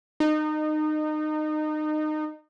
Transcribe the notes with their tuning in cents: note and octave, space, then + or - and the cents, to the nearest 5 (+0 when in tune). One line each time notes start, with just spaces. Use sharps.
D#4 -25